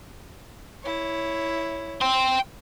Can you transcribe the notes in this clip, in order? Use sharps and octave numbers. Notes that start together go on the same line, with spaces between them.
E4 C#5
G5 C6